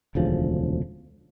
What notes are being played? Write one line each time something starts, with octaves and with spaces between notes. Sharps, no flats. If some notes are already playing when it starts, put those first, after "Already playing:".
E1 D2 C#3 F3